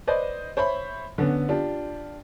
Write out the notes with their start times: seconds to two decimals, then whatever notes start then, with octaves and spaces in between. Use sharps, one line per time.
0.07 B4 C5 D5 D#5
0.57 C5 C#5 E5 B5
1.18 D3 B3 C#4
1.49 D4 F4 G4